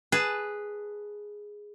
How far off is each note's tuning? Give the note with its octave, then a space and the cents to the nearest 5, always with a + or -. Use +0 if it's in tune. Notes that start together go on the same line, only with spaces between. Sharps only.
G#4 +0 B4 +0 A5 +0